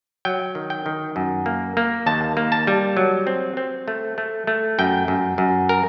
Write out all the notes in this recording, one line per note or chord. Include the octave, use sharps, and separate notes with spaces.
F#3 G5
D#3
G5
D#3
F#2
A#3
A#3
D#2 A5
A#3
A5
G3
F#3
C4
C4
A3
A3
A3
F#2 G5
F#2
F#2
A#4